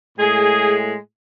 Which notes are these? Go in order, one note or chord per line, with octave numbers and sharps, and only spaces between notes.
A2 G#3 G#4